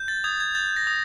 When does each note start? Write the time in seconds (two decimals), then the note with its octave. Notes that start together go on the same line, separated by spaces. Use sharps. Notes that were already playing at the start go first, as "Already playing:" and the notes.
Already playing: G6
0.08 A6
0.24 D#6 G#6
0.40 G#6
0.55 G6 A6
0.76 A#6
0.87 D#6